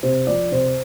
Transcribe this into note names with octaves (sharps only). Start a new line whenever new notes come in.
C3 C5
F3 D5
C3 C5